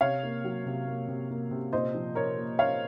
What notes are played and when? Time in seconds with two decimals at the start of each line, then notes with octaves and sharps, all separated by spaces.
0.01 C3 C#5 F5
0.23 A#3
0.44 F#3
0.66 C3
0.88 A#3
1.08 C3
1.30 A#3
1.51 C3
1.72 A#2 C5 D#5
1.94 F3
2.15 A#2 A#4 C#5
2.38 A#3
2.59 A#3 C#5 F5